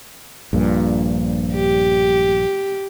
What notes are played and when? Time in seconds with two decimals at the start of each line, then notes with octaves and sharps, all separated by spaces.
0.53 A#1 G2 A#2
1.54 G4